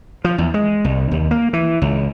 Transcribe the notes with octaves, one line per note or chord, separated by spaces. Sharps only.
F3
E2
G#3
C2
D#2
A#3
E3
C#2